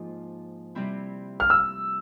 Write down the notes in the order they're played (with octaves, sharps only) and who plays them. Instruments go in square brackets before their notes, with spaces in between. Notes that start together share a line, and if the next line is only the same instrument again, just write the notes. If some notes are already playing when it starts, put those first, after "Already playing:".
Already playing: [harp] G#2 F3 A#3 F4
C3 G3 C4 E4
[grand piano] F6
E6